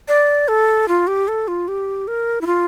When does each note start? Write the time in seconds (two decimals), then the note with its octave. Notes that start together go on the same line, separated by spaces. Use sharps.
0.08 D5
0.48 A4
0.88 F4
1.07 G4
1.28 A4
1.48 F4
1.68 G4
2.08 A#4
2.41 E4
2.46 F4